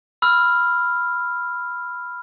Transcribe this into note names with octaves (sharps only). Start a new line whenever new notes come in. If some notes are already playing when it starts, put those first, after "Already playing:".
B5 E6 F6